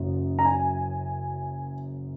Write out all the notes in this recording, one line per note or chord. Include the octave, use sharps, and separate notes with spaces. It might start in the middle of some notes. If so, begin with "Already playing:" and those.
Already playing: F#1 F#2
A#5
G#5